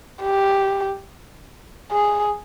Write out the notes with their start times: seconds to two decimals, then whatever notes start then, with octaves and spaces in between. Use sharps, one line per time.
0.22 G4
1.92 G#4